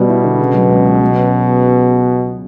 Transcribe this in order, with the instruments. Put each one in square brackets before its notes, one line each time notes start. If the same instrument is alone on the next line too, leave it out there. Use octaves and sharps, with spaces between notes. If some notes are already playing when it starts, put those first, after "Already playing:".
Already playing: [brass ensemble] B2 [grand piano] G3 B3
[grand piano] E4
D3
C#3
F#3
C#2
C#2
F#3
C#4